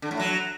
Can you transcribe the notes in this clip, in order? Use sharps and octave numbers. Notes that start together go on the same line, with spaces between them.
D3
A2
F#3